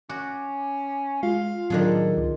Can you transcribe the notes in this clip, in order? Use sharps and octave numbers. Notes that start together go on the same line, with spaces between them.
C#4 F#4 D6
G#3 F4 F5
A2 D#3 F#3 C4 D4 G#4 A4
C#2